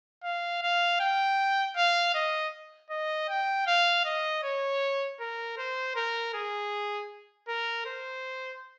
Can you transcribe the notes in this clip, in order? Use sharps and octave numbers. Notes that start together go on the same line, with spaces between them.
F5
F5
G5
F5
D#5
D#5
G5
F5
D#5
C#5
A#4
C5
A#4
G#4
A#4
C5